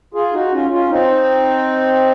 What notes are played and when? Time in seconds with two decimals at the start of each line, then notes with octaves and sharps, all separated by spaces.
0.14 F4 G#4
0.33 D#4 F#4
0.52 C#4 F4
0.70 C#4 F4
0.90 C4 D#4